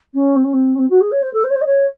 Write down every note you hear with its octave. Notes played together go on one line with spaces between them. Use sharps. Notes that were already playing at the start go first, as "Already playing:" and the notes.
C#4
C4
C#4
C4
C#4
C4
F#4
G#4
C#5
C5
A4
C5
C#5
C5
D#5
C#5